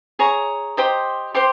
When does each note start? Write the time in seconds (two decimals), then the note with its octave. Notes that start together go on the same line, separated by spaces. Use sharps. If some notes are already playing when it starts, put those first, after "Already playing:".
0.19 G#4 C#5 A#5
0.77 G4 C5 D#5
1.34 G4 C5 C6